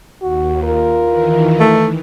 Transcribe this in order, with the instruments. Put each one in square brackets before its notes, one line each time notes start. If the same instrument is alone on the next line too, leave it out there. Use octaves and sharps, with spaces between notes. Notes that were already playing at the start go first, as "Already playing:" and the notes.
[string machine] D#2 [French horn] F#4
[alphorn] F4 [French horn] A#4
[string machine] D#3 E3
[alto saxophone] A3